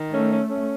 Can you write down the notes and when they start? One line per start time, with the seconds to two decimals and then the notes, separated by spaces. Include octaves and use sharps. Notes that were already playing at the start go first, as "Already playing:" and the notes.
Already playing: D#3
0.10 A3 C#4
0.29 C#4
0.48 C#4